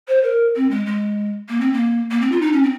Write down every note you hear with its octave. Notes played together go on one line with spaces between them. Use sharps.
C5
A#4
C4
G#3
G#3
A#3
C4
A#3
A#3
C4
F4
D#4
C#4
C4